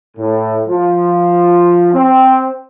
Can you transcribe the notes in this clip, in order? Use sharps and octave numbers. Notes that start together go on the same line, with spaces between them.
A2
F3
C4